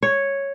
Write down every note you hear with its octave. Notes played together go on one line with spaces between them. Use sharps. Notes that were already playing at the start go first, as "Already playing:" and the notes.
C#5